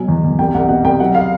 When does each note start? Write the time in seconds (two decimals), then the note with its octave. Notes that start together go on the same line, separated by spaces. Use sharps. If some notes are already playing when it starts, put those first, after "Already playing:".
Already playing: B2 F#3 G#5
0.08 E2
0.24 E2
0.39 C2 G5
0.55 C2 F#5
0.69 B2 F#5
0.84 C2 G5
1.00 F#3 F#5
1.15 F5